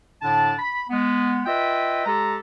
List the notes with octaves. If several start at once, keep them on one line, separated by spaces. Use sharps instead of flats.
A2 D3 D4 A5
B5
G#3 B3
F4 B4 D#5 E5 G5
G#3 G4 A4 A#5